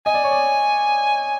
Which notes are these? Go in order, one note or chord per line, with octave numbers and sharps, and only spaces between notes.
D#5 G#5
D5
C#5
D5